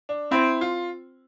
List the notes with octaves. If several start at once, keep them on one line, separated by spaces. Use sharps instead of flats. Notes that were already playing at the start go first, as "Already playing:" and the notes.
D4
C4 E4
F4